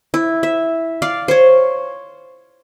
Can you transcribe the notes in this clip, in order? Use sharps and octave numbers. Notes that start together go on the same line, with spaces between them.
E4
E5
D5 F5
C5 C#5